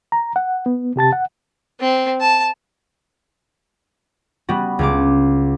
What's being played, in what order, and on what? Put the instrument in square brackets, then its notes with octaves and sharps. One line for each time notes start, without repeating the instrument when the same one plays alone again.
[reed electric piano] A#5
F#5
B3
C3 G4 A5 A6
F#5
[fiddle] C4
A5
[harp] G3 B3 F#4
C#2 C#4 D6